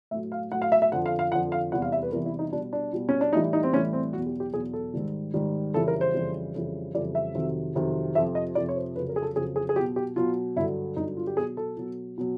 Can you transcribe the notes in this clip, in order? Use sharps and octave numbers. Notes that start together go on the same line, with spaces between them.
A2 F#3 E5
F5
A2 F#3 F#5
F5
E5
E5
F2 D3 F3 F#5
F5
F5
F2 D3 F3 F#5
F5
E2 C3 E3 G3 F#5
F5
E5
B4
E2 C3 E3 G3 A#4
E4
D#4
B2 G3 D4
D4
B2 G3
C#4
D4
A2 E3 G3 D#4
D#4
C4
A2 E3 G3 C#4
C4
E2 B2 F#3 F#4
G4
G4
E2 B2 F#3 G#4
A4
G#2 D#3 G3
G#2 D#3 G3
F2 C#3 E3 G3 A4
A#4
C5
F2 C#3 E3 G3
F2 C#3 E3 G3
F2 C#3 E3 G3 D5
E5
F2 C3 D#3 F#3
F2 C3 D#3 F#3
F2 C3 F3 E5
D#5
F2 C3 F3 D5
C#5
C5
F2 C#3 F#3 B4
A#4
G#4
A4
F2 C#3 F#3 G#4
G#4
G#4
B2 F#3 G4
G4
B2 F#3 F4
G2 D3 F#3 E4
G2 D3 F#3 D#4
F4
G4
B2 F#3 G#4
A4
B2 F#3
B2 F#3